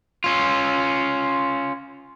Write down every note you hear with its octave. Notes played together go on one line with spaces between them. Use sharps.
C#4 F4